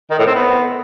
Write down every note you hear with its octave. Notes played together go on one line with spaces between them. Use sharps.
D#3
A2
C4
B3